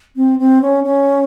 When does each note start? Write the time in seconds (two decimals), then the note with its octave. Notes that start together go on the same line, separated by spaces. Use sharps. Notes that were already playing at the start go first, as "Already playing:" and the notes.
0.16 C4
0.39 C4
0.62 C#4
0.84 C#4